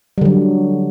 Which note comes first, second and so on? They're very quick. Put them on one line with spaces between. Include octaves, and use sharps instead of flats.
G3 D3 F#3